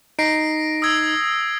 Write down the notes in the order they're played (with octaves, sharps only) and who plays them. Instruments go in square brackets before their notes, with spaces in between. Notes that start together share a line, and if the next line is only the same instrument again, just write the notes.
[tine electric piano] D#4 [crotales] A#6 C7 D7
[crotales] D#6 E6 G#6